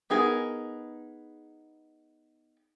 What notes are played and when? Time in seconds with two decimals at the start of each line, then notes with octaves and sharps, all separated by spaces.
0.10 B3 D#4 G#4 A#4